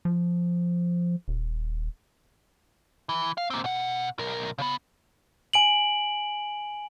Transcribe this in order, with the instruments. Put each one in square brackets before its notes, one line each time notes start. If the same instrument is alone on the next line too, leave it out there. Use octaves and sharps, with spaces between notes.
[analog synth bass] F3
D#1
[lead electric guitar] E3
F5
A#3 C4
B2 F#5
B1 A#4
C#3 B3
[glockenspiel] G#5 D7 F#7